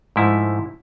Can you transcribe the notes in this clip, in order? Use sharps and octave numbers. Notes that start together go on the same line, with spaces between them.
G#2 F3 A3 E4